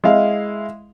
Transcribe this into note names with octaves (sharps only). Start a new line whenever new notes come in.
G#3 E4 F5